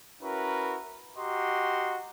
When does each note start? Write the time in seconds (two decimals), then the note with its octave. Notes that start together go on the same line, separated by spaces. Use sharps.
0.21 C#4 E4 F#4 A#4 B4
1.17 F#4 G4 D#5 A#5 C6